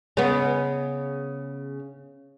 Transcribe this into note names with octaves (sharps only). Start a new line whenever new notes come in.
C#3 B3